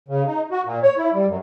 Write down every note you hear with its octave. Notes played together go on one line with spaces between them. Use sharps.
C#3
D#4
F#4
A#2
C#5
E4
G3
F#2